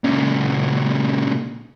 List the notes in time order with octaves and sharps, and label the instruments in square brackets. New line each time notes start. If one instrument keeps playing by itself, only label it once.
[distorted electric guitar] A#2 C#3